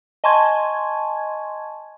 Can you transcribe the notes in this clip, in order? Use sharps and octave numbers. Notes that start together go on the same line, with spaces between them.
D#5 G#5 A5 C6 C#6 G#6